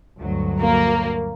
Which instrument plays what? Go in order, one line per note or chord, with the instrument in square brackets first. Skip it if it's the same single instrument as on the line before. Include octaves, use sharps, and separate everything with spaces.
[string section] D2 G2 F#3
[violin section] A#3